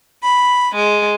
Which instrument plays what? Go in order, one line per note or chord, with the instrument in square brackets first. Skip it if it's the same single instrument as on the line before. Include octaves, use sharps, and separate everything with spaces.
[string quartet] B5
G#3